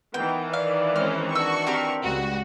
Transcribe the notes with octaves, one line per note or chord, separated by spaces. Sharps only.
D#3 E3 B3 G5
D5 F5
G#3 C4 C#4 F6
D4 F#4 C#6 E6
C4 G4 A#4
C#2 G3 F#4